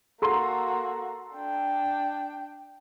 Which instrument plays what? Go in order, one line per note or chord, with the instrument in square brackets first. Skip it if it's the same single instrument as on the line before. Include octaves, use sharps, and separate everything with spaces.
[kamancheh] A#3 F#4 [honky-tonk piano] A4 A#5 C6
[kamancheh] D4 G5